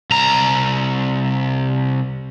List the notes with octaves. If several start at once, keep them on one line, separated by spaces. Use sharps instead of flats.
C2 A#5